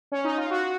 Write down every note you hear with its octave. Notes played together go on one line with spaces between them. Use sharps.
C#4
D#4
F4
F#4